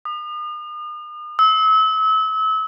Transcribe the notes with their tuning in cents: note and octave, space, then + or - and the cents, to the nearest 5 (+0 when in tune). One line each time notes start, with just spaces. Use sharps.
D#6 -40
E6 -35